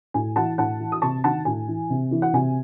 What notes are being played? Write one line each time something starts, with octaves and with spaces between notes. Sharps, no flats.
A2 G#5
E3 F#5 A5
A2 F#5 A5
E3
D#6
C3 A5 C#6
D#3 F#5 A5
A2 G#5
E3
C3
E3
F#5
C3 G#5